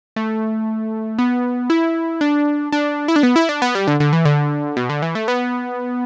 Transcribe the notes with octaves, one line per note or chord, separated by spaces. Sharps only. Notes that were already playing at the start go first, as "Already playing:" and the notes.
A3
B3
E4
D4
D4
E4
D4
B3
E4
D4
B3
G3
D3
D3
E3
D3
B2
D3
E3
A3
B3